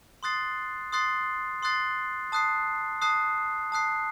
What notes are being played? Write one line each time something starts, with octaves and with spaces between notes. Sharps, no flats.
C6 D#6 F#6 A6 C7
C6 D#6 F#6 A6 C7
C6 D#6 F#6 A6 C7
A5 D#6 F#6 C7
A5 D#6 F#6 C7
A5 D#6 F#6 C7